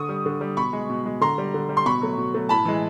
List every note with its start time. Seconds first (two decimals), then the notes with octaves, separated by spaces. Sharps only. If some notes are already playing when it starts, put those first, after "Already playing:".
Already playing: D3 C#6 D#6
0.09 G3
0.26 D3
0.41 G3
0.57 B2 B5 C#6
0.73 G#3
0.90 B2
1.06 G#3
1.21 D3 A#5 C6
1.38 G3
1.54 D3
1.69 G3
1.77 C6
1.86 B2 B5 C#6
2.01 F#3 A3
2.18 B2
2.34 F#3 A3
2.49 A2 A5 B5
2.65 E3 G#3